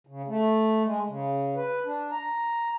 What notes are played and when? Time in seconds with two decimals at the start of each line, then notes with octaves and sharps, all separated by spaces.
0.07 C#3
0.28 A3
0.85 G#3
1.07 C#3
1.56 B4
1.85 D4
2.11 A#5